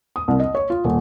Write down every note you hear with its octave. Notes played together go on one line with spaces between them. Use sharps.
D#6
C2
D#5
C#5
F4
D#1